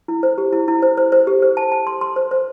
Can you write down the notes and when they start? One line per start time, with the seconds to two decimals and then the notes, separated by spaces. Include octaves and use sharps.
0.08 E4
0.23 C5
0.38 G4
0.53 E4
0.68 E4
0.82 C5
0.97 C5
1.12 C5
1.27 G4
1.42 C5
1.57 A5
1.72 A5
1.87 C6
2.01 C6
2.16 C5
2.31 C5